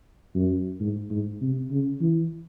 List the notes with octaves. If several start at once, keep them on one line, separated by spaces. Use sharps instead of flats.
F#2
G#2
G#2
C3
C#3
E3